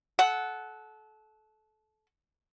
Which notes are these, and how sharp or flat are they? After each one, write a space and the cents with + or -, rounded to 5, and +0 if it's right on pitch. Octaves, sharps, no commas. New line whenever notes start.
A4 -25 F#5 +0